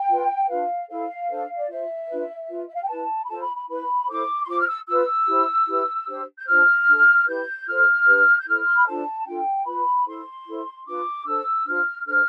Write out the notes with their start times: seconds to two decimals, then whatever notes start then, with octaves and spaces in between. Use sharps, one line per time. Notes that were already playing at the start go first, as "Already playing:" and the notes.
Already playing: G5
0.09 F4 B4
0.48 D4 F4 B4 F5
0.88 E4 A4 C5 F5
1.28 D4 A4 C5
1.57 D5
1.68 F4 C5 E5
2.08 D4 F4 B4
2.48 F4 B4
2.66 E5
2.73 F5
2.81 G5
2.88 E4 B4 A5
3.24 B5
3.27 F4 A4 C5 A5
3.41 B5
3.54 B5
3.67 E4 B4 B5
4.07 E4 A4 C5 D6
4.43 C6
4.47 F4 C5 D6
4.58 F6
4.67 E6
4.87 F4 B4 E6
5.27 E4 G4 C5
5.67 E4 G4 B4
6.08 D4 G4 C5
6.38 G6
6.47 D4 F4 C5 F6
6.87 D4 F4 A4
7.26 E4 G4 B4 G6
7.67 F4 A4 C5 F6
8.07 D4 G4 B4
8.38 G6
8.46 E4 A4 C5 F6
8.66 C6
8.75 B5
8.86 D4 F4 A4 C5 A5
9.26 D4 F4 A4 G5
9.65 F4 B4 B5
10.06 E4 A4 C5 C6
10.46 E4 A4 C5
10.85 D4 F4 B4 D6
11.25 D4 A4 C5 E6
11.65 D4 F4 C5 F6
12.05 D4 A4 C5 F6